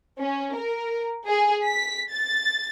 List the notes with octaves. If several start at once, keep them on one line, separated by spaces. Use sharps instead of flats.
C#4
A#4
G#4
B6
A6